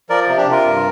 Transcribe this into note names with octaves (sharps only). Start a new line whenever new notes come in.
F3 A#4 D5
C3
D4 G4
C3 F4 A#4
G2